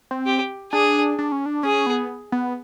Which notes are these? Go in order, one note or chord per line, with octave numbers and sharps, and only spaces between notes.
C4
G4
D4 G#4
D4
C#4
D4
C#4 G#4
B3
B3